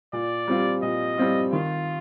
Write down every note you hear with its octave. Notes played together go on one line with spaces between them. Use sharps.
A#2 D5
G3 C4 F4
A#2 D#5
G3 C4 F4
D#3 F4